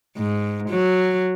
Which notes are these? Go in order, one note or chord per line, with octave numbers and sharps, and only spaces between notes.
G#2
F#3